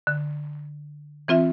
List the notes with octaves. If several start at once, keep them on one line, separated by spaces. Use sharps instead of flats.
D3
E3 C4 F4 E5